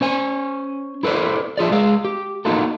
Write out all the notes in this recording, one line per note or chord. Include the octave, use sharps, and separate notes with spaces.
C#4 C5 G#5
E4 A4 B4 C5 D5
D4 F4 G#4 D5
G#3 G#4 F5
G4
A#3 D#4 F4 F#4 A4